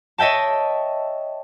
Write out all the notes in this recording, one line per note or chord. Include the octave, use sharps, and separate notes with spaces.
C#5 D#5 E5 G5 A5